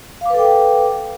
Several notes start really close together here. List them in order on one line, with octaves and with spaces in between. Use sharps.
F5 D6 B4 A4 G5